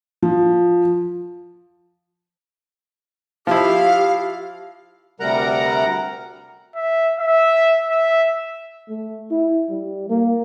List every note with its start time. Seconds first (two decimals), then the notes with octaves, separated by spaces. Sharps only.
0.22 F3
3.47 F3 E4 G4 F5
5.20 D2 C3 G3 A#4 F#5 A#5
6.76 E5
7.20 E5
7.90 E5
8.89 A3
9.31 E4
9.70 G3
10.09 A#3